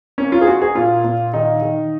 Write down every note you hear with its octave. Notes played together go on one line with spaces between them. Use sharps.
A#3 C#4
F4
G#4
A#3 F#4
G#4
A#2 F4
A#2
D#3 D#4
D#3